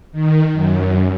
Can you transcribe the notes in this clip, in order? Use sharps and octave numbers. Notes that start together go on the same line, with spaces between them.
D#3
F#2